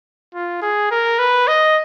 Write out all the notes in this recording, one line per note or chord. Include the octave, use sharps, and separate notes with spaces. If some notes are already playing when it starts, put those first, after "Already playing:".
F4
G#4
A#4
B4
D#5